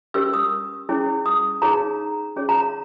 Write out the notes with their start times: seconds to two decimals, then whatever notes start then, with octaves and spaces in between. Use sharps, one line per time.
0.14 C#4 G4 A#4 C#5 E6
0.33 D#6
0.89 C#4 E4 G#4 C#5
1.26 D#6
1.62 D#4 G#4 C#5 A#5
2.36 C#4 G#4 C#5
2.49 A#5